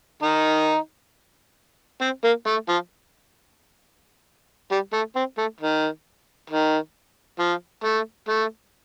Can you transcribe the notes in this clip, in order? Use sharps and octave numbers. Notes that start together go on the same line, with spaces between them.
D#3 D#4
C4
A#3
A3
F3
G3
A3
C4
A3
D#3
D#3
F3
A3
A3